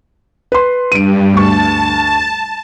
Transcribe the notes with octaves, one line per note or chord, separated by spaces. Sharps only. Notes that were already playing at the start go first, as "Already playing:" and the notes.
B4 C6
G2 D7 D#7
D2 A5 C#6